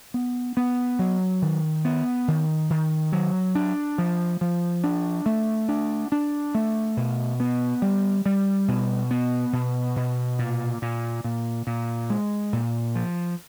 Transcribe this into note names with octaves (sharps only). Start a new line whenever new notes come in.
B3
B3
F#3
D#3
B3
D#3
D#3
F#3
D4
F3
F3
D4
A3
D4
D4
A3
B2
B3
G3
G3
B2
B3
B2
B2
A#2
A#2
A#2
A#2
G#3
A#2
F3